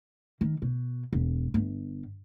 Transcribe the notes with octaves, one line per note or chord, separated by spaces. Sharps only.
D#3
B2
E1
G1